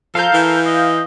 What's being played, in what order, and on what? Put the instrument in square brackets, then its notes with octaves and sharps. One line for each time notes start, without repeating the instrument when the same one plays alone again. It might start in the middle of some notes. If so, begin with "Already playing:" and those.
[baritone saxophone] F3 [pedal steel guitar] A4 A#4 [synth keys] F5 G6
[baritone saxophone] E3
[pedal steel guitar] D#5